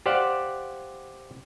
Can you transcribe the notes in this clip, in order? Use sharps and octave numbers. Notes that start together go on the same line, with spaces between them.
G4 C5 D5 F5 F#5